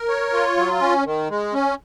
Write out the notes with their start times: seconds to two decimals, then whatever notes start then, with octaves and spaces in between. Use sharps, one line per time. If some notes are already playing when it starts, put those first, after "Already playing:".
Already playing: A#4
0.09 C#5
0.33 F4
0.57 F#3
0.81 C#4
1.05 D#3
1.30 G#3
1.54 C#4